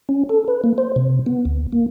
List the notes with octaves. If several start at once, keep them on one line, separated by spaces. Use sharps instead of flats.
C#4
A4
B4
A#3
C5
C3
B3
D2
A#3